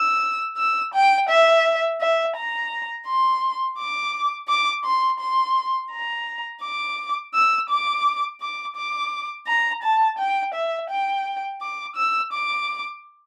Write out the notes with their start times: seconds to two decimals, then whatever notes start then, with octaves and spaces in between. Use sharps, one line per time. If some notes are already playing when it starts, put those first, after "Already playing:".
Already playing: E6
0.57 E6
0.94 G5
1.29 E5
2.01 E5
2.36 A#5
3.07 C6
3.78 D6
4.48 D6
4.85 C6
5.20 C6
5.91 A#5
6.63 D6
7.34 E6
7.69 D6
8.41 D6
8.76 D6
9.47 A#5
9.83 A5
10.18 G5
10.54 E5
10.90 G5
11.61 D6
11.96 E6
12.33 D6